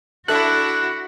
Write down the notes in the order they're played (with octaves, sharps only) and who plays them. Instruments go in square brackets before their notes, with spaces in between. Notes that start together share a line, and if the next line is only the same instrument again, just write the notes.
[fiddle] D4 E4 [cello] F#4 [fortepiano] A4 E5 [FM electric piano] F#6